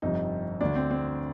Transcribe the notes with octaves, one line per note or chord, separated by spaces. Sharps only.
G1 F2 C3 D#4
D2 D3 D4
C4
C4